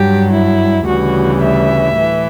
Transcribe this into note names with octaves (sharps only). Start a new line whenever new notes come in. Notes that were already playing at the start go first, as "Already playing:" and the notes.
Already playing: G2 F#3 G4
E4
D2 C#3 E3 G3 F#4
E5
A2 E3